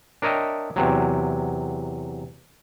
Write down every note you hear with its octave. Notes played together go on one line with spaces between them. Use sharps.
D4 A#4 C#5 D#5 E5 G5
E2 C3 F#3